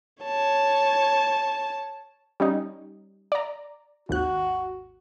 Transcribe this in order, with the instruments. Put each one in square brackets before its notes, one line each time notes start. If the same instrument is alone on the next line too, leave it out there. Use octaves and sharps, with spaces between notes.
[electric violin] C#5 A5
[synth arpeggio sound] G3 C#4 D#4
D5 A#5
[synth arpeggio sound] G#1 D#2 F#6 [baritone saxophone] F#4